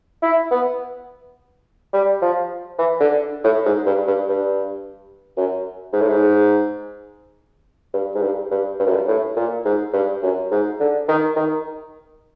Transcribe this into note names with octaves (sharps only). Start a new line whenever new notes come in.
E4
B3
G3
F3
E3
D3
A2
G#2
G2
G2
G2
F#2
G#2
A2
G#2
G2
G#2
G2
G2
G2
F#2
G2
A2
A#2
G#2
G2
F#2
G#2
D3
D#3
D#3